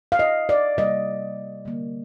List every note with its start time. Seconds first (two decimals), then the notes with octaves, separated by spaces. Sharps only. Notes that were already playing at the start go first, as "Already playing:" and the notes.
0.12 F5
0.19 D#5
0.49 D5
0.77 C3 G3 A#3 D#5
1.65 D3 G3 A#3